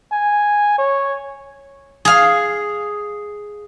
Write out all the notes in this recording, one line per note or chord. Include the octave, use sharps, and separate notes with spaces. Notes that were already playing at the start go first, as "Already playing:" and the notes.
G#5
C#5
G#4 F5